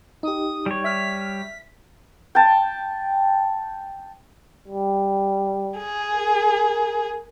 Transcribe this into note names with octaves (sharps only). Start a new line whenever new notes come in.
D#4 G4 D#6
G3 C#5
E5 F6 B6
G5 A5
G3
G#4
A#4